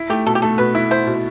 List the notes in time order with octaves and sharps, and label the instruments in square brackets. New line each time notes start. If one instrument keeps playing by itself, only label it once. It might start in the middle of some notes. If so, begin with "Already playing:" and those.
Already playing: [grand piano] E4
[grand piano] A3 [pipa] G4
[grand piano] B2 [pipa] A4
[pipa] G4
[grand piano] A3 [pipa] A4
[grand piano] B2 [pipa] B4
[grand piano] E4
[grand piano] E4 [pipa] C5
[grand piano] B2